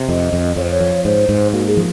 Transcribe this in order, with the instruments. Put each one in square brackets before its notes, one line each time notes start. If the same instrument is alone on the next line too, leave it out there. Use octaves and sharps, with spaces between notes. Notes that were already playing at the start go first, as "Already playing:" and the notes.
Already playing: [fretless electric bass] C3
[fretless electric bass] F2 [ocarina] D#5
[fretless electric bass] F2
[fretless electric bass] F2 [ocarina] C#5
[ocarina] C5
C#5
[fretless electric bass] F3
[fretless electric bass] G#2 [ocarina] C5
[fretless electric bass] G#2
[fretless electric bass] A#3 [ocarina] F#4
[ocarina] G#4
[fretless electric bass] F3